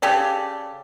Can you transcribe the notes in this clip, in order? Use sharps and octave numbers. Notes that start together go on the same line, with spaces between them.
C#3 G4 A4 D5